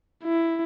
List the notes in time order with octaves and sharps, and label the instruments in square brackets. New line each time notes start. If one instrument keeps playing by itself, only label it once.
[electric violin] E4